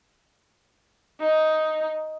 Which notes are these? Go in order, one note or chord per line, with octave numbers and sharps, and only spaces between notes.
D#4